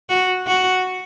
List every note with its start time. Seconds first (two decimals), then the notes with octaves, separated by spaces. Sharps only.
0.09 F#4
0.47 F#4